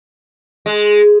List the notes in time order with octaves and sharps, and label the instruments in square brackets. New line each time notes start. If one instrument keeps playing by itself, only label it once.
[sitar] G#3